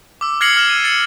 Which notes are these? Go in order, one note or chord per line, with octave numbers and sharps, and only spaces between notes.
D6 E6
F6 G#6 A#6 C7 C#7 F#7
D6 F6 G#6 E7
D#7
A6 C#7